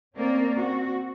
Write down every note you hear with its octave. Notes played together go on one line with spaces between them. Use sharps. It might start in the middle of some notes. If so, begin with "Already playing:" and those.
A#3 C4 C#4 A#4 D5
C4 F#4